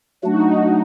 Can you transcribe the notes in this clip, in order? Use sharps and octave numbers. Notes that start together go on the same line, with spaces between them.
F#3 A3 D4 F#4
D#4
F#4
D#4